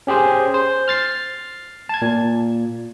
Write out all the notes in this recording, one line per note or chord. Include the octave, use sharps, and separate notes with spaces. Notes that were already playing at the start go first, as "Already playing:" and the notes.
C#4 G4 G#4 C5
C5
F6 A6 C7
A5 G#6
A#2